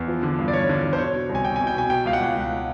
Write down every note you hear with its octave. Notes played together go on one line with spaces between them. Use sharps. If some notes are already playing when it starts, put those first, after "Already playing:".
Already playing: E2
F3
D3
G2
D5
G2 C#5
D3
D3
C5
B2 C#5
B2
C2
G#5
C2 G5
G#5
B2
G5
B2 G#5
B2 G5
C#2 F5
F#5
C#2
C#2